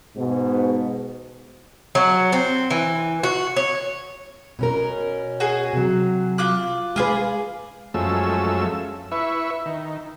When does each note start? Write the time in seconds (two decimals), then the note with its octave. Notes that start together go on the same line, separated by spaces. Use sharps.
0.16 G#2 B2
1.95 F#3
2.33 C4
2.71 E3
3.23 F#4
3.56 C#5
4.59 B2 C#4 A#4
5.40 F#4 G#4
5.73 C3 F#3
6.38 F4 D6 F#6
6.96 G#3 F4 G#4 B4 D5
7.94 F#2 F3 G#3 A3 C#4 E6
9.11 E4 B4 E5 C#6
9.66 D#3